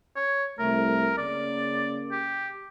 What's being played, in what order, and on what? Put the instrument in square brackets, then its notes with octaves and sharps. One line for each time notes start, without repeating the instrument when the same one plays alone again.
[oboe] C#5
[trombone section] C2 A3 [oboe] A#4
[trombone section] C#3 A#3 [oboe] D5
[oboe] G4